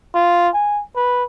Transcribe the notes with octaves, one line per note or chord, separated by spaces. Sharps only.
F4
G#5
B4